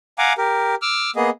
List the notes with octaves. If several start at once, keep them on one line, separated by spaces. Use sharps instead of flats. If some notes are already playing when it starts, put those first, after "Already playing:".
F5 F#5 G#5 A#5 D6
G4 A#4
D6 E6 F6
A#3 B3 G#4 D#5